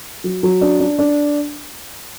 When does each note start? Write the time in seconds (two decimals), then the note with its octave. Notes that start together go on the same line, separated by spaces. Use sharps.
0.24 F#3
0.43 F#3
0.61 D4
0.80 D4
0.98 D4